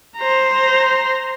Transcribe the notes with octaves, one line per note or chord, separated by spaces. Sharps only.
C5 A#5